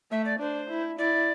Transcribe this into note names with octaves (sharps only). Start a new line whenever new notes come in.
A3 E5
D5
D4 C5
E4
E4 D5